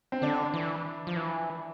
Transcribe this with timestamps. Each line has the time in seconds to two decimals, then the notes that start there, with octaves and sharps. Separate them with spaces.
0.12 C4
0.22 D3 D4
0.54 E3
1.07 F3
1.16 E3